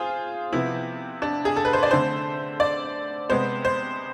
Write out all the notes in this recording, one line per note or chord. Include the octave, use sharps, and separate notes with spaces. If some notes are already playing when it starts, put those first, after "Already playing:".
Already playing: F4 G#4 C5
C3 F3 B3 E4
D4
G#4
A4
B4
C5
D5
D3 A3 C4 C5
D5
C3 G#3 B3 C5
C5